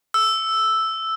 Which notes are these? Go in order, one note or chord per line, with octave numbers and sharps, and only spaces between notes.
E6